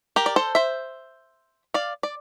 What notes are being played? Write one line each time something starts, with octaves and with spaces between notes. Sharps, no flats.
G4 A#4
D5
A4 C5
C5 E5
D5 F5
D5